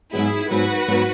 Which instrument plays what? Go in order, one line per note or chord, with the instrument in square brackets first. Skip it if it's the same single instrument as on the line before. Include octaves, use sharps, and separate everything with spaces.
[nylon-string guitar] G#2 F#3 B3 [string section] E4 G#4
[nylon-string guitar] G#2 F#3 B3 [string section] F#4 B4
[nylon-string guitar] G#2 F#3 B3